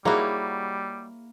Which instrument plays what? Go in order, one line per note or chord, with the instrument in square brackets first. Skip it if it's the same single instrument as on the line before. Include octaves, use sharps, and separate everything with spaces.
[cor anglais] G3 [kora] A#3 E4 C#5 [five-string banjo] D#4 F#4 [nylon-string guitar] G#4 F#5